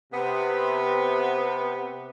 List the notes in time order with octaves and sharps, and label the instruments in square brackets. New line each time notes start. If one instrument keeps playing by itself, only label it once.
[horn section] C3 B3